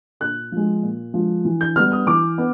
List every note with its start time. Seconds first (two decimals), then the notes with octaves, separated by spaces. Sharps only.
0.20 A#2 F#6
0.52 F3 G#3
0.83 A#2
1.14 F3 G#3
1.45 E3
1.61 G6
1.76 G3 B3 F6
1.92 D#6
2.07 E3 D6
2.38 B3